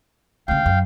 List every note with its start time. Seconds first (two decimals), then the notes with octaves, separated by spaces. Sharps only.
0.48 D2 C#3 F5 G5
0.66 F#2